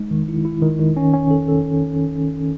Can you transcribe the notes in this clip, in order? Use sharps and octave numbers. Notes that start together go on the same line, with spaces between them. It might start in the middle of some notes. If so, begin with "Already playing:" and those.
Already playing: G#3 D#4
D#3
E4
E4
D#3
D#3
C#4
C#4
A4
A4